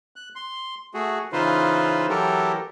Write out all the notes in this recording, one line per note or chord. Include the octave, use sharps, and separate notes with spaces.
F#6
C6
A3 F#4 G#4
C#3 E3 D#4 F4 B4 C5
E3 F#3 G4 A4 A#4